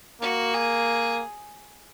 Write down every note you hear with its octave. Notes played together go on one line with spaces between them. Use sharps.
A#3 F#4
G#4